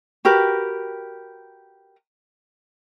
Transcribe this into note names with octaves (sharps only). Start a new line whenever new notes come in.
F#4 G4 A#4 B4